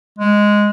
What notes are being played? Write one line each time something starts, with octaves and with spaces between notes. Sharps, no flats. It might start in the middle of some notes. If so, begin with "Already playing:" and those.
G#3